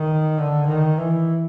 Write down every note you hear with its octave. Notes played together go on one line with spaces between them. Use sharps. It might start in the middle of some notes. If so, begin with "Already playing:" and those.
Already playing: D#3
D3
D#3
E3